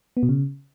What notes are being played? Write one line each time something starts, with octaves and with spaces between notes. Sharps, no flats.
B3
B2
C#3